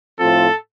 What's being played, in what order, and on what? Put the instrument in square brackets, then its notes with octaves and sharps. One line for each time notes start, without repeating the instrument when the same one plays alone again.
[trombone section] A2 F3 C4 F4 [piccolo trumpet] A4